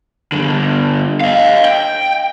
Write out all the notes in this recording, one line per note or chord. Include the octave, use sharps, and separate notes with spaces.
G2 D3
D#5 F5
G5